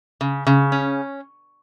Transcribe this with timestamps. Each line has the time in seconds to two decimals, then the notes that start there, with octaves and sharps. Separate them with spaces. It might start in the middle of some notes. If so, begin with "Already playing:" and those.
0.21 C#3
0.47 C#3
0.72 C#4